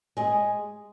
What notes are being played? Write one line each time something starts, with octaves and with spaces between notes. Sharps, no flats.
G#3 G#4